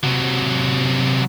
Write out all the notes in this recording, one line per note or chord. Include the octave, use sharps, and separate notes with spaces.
C3 F#3